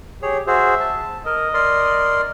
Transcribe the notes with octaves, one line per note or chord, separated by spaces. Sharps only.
G4 G#4 C#5
F#4 G#4 C5 E5
A5
A#4 D#5
A#4 D5 C6